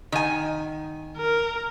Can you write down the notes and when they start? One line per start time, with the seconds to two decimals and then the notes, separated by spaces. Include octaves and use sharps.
0.12 D#3 G#5
1.17 A#4